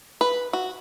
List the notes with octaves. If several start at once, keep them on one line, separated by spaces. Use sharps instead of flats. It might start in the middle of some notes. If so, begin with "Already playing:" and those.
B4
F#4